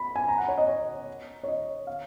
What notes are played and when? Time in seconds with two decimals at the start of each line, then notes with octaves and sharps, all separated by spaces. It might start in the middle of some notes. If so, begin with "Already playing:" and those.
Already playing: B5
0.16 G#5
0.28 A#5
0.38 F#5
0.48 C#5
0.58 D#5
0.68 C#5
1.44 C#5
1.48 D#5
1.87 F5